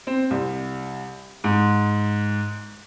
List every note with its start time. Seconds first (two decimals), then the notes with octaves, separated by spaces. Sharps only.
0.07 C4
0.31 C2
1.44 G#2